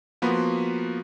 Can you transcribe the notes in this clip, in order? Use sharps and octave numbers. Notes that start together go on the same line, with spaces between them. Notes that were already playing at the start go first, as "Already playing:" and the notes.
F3 A#3 B3 F#4 B5 C6